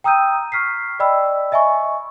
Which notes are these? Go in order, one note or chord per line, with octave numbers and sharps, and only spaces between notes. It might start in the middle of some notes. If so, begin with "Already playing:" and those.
G5 A#5 D#6 E6 G6 D#7
C#6 F6 B6 C7
D5 D#5 G5 B5 E6
D#5 E5 G#5 B5 C#6